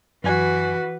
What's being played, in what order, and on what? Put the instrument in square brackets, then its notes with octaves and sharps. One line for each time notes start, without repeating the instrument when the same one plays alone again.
[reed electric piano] F#2 G#5 [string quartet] E3 [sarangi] F#4 [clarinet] B4